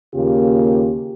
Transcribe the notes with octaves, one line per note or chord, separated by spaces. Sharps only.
D#2 C#3 A#3 F4 G4